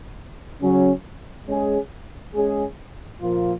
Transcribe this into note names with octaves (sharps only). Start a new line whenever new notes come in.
C#3 F#3 C#4
G#3 C#4 G#4
G#3 C#4 G#4
A#2 F3 A#3 F4